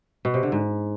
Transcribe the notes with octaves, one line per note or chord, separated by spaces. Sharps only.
B2
C3
D3
G#2